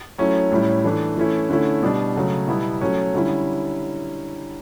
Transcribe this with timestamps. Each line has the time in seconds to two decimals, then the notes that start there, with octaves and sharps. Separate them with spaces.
0.18 F#3 A3 C#4 E4
0.51 A2 G3 C#4 E4
0.84 E3 A3 D4
1.17 E3 A3 C#4 E4
1.50 D3 A3 C#4 E4
1.83 B2 G3 D4
2.15 C#3 F#3 A3
2.48 B2 G3 B3 E4
2.81 F#3 A3 C#4
3.14 D3 G3 C#4 E4